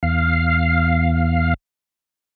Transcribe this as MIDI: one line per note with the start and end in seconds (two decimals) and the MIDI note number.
0.03 1.54 40
0.03 1.54 77